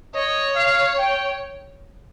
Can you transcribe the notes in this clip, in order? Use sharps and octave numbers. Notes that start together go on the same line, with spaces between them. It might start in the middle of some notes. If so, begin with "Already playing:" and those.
C#5 D#5
F5
G5